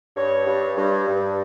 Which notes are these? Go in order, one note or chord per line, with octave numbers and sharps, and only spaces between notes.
G2 C#5
G2
G2
G2